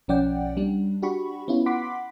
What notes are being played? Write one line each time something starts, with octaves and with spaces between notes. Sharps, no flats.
B1 F3 C#4 D5 F#5 G5
G3 D4
D4 F#4 G4 B5 C#6
B3 C#4 E4 F4
F#5 B5 C6 D6 B6